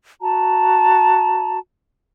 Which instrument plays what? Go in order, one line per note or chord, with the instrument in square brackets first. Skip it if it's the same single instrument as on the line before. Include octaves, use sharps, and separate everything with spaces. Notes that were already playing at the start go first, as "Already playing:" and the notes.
[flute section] F#4 A5 A#5